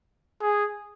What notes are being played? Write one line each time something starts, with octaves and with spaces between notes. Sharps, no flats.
G#4